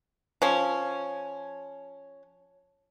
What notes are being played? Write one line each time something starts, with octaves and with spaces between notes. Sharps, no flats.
F3 C#4